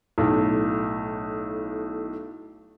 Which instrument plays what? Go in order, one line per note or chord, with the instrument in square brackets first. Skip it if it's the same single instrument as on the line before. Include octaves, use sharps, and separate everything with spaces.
[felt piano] B1 A2